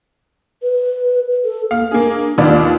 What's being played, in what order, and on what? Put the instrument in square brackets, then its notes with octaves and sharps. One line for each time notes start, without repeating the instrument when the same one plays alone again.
[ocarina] B4
A4
[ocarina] A#3 [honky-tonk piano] F5
[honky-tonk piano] A#3 G#4 [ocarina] D4
[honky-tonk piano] D#2 B3 D4 [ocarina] F4